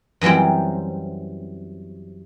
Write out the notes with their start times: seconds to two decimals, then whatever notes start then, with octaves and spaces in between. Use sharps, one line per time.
0.21 F#2 E3 F#3 G3 C4